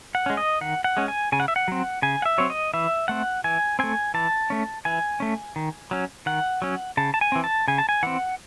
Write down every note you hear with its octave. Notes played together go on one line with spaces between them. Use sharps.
F#5
G#3 C#4
D#5
D#3 F#5
F#5
G#3 C#4
G#5
C#3 G#5
F#5
E5
F#5
F#3 C4
C#3 G#5
F#5
E5
F#3 C4 C#5
D#5
E3 E5
A3 C4 F#5
E3 G#5
A3 C4 G#5
E3 A5
A3 C#4
E3 G#5
A3 C#4
D#3
F#3 C#4
D#3 F#5
F#3 C#4
C#3 A5
A5
G#5
E3 C4
A5
C#3 G#5
A5
G#5
E3 C4 F#5